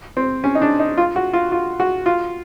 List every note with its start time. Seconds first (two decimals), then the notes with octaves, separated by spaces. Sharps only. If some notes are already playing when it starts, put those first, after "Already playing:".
0.17 C4
0.44 C#4
0.55 D#4
0.62 D4
0.80 D#4
0.98 F4
1.16 F#4
1.33 F4
1.52 F4
1.80 F#4
2.06 F4